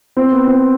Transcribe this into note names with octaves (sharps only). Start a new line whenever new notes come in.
C4
B3
C4